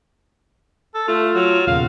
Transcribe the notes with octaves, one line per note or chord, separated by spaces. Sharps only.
A4
A3 F4
F#3
E2 A#2 C#3 F5